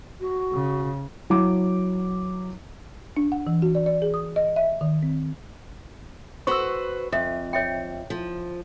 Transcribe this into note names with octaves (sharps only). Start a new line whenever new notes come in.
F#4
C#3
F#3 E4 D6
D4
F#5
E3
F#4
D5
D5
G#4
D#6
D#5
E5
D#3
C4
F#4 B4 C5 C#6 E6
F2 E5
C#5 E5 G5
F3